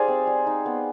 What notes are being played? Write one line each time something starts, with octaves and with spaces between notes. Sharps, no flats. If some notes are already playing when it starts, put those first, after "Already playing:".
Already playing: G3 D#4 G#4 C5 D5 F5
C4
G3
D#4
B3